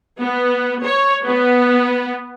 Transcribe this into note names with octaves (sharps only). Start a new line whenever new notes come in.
B3
C#5
B3